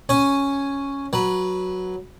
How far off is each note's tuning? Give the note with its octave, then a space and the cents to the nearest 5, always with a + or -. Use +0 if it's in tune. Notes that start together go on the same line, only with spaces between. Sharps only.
C#4 +0 C#5 +0 G#5 +0
F#3 +0 B4 -15